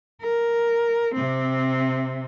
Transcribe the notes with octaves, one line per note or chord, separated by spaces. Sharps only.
A#4
C3 C4